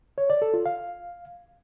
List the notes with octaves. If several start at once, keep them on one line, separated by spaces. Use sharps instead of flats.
C#5
D5
A4
F4
F5